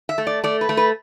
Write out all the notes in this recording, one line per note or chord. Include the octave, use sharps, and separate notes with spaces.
E5
A3
D5
A3 D5
B4
A3
B4